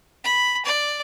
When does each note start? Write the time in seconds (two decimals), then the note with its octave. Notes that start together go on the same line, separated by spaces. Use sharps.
0.24 B5
0.66 D5